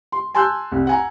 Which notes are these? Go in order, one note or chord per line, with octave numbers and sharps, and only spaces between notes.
C6
G#5 A5 C6 E6 F#6 G6
C2
F#5 G#5 A#5